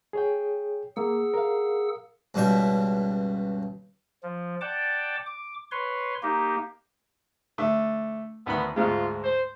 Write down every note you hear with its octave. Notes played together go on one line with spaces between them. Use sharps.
G#4 C#5 G5
A#3 G#4 F#5 E6
A#4 F5
C#2 G2 B2 E5 G5
F3
D5 F#5 G5 A5 D6
D6
B4 C#5 C6
A#3 D#4 G4
D3 A3
D2 D#3 B3 B5
D2 G#2 G#3 F4
C5